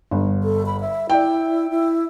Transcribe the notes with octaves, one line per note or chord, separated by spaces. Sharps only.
G1
A4
B5
E5
E4 D5 G5
E4